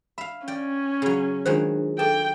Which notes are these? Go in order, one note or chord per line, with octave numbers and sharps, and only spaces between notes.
E5 F5 B5
C#4 D5 G5
C#3 F#3
D#3 F#3 G#3 D4 F4 C5
G#4 A4 G5 A5